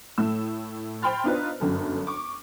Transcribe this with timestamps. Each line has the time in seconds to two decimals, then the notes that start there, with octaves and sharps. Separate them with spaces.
0.18 A2 A3 E6
1.02 C5 G5 B5 C6 F6 A6
1.24 B3 D4 D#4 F4 B4 C5
1.60 G1 F#2 A4
2.07 C#6 D6